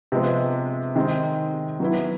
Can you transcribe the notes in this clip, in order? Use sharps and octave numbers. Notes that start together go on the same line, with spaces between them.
C3 F3 G#3 B3
D#3 G#3 C4
F#3 B3 E4